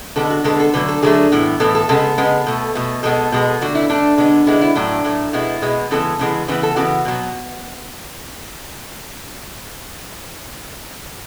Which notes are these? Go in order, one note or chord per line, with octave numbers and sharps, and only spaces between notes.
D3 G#3 B3 A4
F#4
D3 G#3 B3 A4
A4
D3 F#3 A3 B4
A4
D3 F#3 A3 G#4
A2 E3 B3
A2 E3 B3 A4
A4
C#3 G#3 B3 A4
C#3 G#3 B3
B2 A3
B2 A3
B2 G#3 B3 A4
B2 G#3 B3
D3 A3 F#4
E4
D3 A3 D4
D3 G#3 B3
D3 G#3 B3 E4
E4
A2 F#3 A3 D4
A2 F#3 A3
B2 G#3 B3 E4
B2 G#3 B3
C#3 E3 G#3 B3 A4
C#3 E3 G#3 B3
C#3 E3 B3 B4
A4
C#3 E3 B3 F#4
B2 F#3 B3